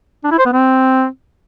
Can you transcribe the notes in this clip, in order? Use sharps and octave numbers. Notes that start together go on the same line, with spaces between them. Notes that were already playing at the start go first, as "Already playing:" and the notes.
D4
E4
C5
B3
C4